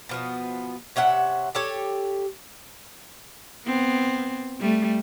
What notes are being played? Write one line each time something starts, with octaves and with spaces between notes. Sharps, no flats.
B2 F3 B3
C3 C#4 E5 F#5
G4 A4 C#5
B3 C4
G3 A3